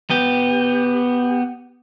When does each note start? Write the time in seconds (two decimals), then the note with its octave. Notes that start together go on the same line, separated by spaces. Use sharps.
0.10 B3 G4